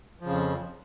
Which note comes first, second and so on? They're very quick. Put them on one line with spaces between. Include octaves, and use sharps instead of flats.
F3 C#3 F2